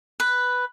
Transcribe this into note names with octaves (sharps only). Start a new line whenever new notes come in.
B4